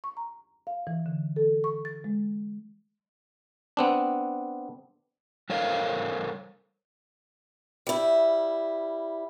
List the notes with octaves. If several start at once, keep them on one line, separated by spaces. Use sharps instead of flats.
C#6
A#5
F5
E3
D3
A4
C#6
A6
G#3
B3 C4 D4
G3 A4 A#4 C5 C#5 F5
G3 E4